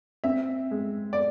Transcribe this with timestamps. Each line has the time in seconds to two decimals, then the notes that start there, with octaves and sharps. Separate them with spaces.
0.24 C4 E5
0.71 G#3
1.13 D5